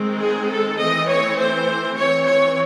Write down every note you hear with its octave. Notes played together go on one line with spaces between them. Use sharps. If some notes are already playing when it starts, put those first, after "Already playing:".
Already playing: D#3 G#3 C4
G#4
A4
E3 A3 C4 D#5
C#5
C5
E3 C4 C#5
C#5